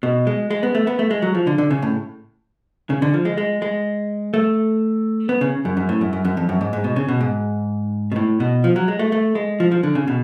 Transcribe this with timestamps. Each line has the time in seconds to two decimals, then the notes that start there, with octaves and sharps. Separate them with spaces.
0.03 B2
0.27 G#3
0.51 G#3
0.63 B3
0.75 A3
0.87 B3
0.99 A3
1.11 G#3
1.22 F#3
1.35 F3
1.47 D3
1.58 D3
1.71 C#3
1.82 A2
2.90 C#3
3.02 D3
3.14 F3
3.25 G#3
3.38 G#3
3.62 G#3
4.34 A3
5.29 B3
5.41 C#3
5.65 F#2
5.77 F#2
5.89 A2
6.01 F#2
6.13 F#2
6.25 F#2
6.37 F2
6.49 F#2
6.61 G#2
6.73 G#2
6.84 B2
6.96 C#3
7.08 B2
7.21 G#2
8.12 B2
8.16 A2
8.40 B2
8.64 F3
8.76 F#3
8.88 G#3
8.99 A3
9.12 A3
9.35 G#3
9.60 F3
9.72 F3
9.83 D3
9.95 C#3
10.07 B2